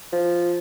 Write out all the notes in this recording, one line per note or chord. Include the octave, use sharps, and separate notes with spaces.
F3